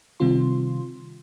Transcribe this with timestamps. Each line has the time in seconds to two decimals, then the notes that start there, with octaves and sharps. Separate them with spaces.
0.20 C3 D#3 G3 C4 F4 C6